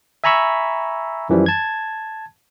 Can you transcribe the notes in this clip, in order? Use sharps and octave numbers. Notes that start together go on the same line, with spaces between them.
E5 G#5 A#5 B5 C#6 E6
F#2 E3 F3 G3
A5 G#6